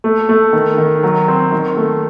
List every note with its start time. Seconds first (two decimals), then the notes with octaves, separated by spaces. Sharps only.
0.04 A3
0.29 A3
0.53 D#3
0.78 D#3
1.03 F#3
1.28 C4
1.52 D#3
1.77 A3